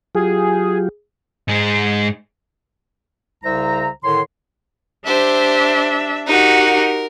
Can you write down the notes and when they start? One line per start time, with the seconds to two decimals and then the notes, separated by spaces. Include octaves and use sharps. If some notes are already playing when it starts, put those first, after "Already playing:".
0.15 F#3 F4 G4 G#4
1.48 G#2 G#3
3.44 C2 C#3 C5 E5 A#5
4.04 A2 D3 D#3 C#5 C6
5.06 D4 G4 C5 E5
6.27 D#4 F#4 G4 A#4